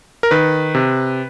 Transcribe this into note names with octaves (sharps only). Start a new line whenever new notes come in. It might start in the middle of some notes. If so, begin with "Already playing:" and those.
A#4
D#3 B4
C3